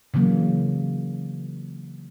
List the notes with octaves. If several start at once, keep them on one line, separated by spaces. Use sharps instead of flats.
C#3 E3 F#3 A#3